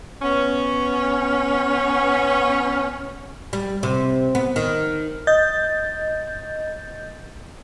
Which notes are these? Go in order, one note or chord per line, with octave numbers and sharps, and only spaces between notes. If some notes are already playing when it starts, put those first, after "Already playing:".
B3 C#4
G3
C3
B3
D#3
D#5 G6 A6